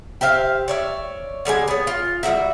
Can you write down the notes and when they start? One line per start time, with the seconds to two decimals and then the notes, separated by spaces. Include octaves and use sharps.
0.21 G4 C5 E5 F5
0.68 C#5 D5 E5
1.45 D3 G3 G#3 G#5
1.68 B3 C#5
1.87 F4
2.23 G3 G#3 F#4 E5